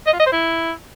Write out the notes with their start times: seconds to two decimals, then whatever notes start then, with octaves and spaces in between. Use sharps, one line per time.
0.06 D#5
0.13 F4
0.19 D#5
0.26 C5
0.32 E4